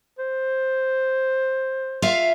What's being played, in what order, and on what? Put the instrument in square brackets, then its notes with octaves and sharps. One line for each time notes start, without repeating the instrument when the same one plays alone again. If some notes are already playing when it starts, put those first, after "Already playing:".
[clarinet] C5
[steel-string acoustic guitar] F4 E5 F5